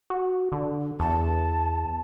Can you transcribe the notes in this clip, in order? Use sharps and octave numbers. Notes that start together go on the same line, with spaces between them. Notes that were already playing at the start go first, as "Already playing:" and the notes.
F#4
D3
E2 A5